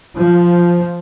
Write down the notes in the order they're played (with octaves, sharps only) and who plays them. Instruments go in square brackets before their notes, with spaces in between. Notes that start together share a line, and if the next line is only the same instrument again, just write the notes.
[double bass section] F3